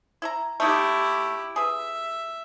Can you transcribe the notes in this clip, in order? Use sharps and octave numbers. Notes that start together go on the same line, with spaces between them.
E4 E5 A#5
A3 D#4 E4 G4
G#4 B4 E5